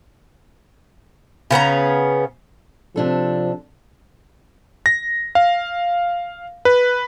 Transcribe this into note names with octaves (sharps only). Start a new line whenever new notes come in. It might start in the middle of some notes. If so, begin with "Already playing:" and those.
C#3 B3 C#4 A#5
C3 F3 D4 A4
A#6
F5
B4